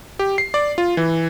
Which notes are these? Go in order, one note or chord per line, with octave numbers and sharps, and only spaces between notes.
G4
C7
D5
F4
E3